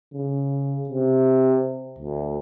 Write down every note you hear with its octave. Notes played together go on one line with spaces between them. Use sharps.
C#3
C3
D2